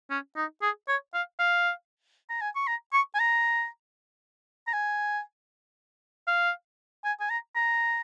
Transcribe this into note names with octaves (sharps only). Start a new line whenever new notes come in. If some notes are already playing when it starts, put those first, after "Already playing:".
C#4
D#4
G#4
C#5
F5
F5
A#5
G#5
C#6
A#5
C#6
G#5
A#5
A#5
G#5
F5
G#5
G#5
A#5
A#5